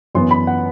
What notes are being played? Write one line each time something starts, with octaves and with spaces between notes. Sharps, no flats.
F#2 E3 B3 C6
B5
F#5